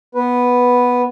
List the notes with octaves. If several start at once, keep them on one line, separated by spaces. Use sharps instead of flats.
B3 B4